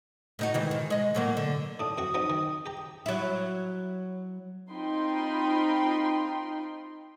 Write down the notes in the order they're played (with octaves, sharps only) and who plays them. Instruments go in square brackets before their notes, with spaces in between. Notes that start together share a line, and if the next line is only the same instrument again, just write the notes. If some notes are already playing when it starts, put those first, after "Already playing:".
[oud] A2 D#4 F#4
G#2 D#3 E3
D#3
G#3 D#5
A2 F#3 A#3
D3
[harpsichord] A2 D4 [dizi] D#6
[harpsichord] F#2 F#4 C#6
F3 F#3 D#4
D#3
G4 A#5
[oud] F#3 E4
[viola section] C4 D#4 F4 G5 B5 C6